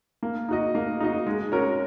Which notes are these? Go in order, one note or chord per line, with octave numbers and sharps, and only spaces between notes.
A#3
D#4 F#4 D#5
A#3
D#4 F#4 D#5
G#3
C#4 F#4 A#4